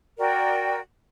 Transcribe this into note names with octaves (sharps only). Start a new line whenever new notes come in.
F#4 A#4 D5 G5